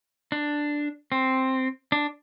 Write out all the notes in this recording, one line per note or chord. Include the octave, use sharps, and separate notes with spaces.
D4
C4
D4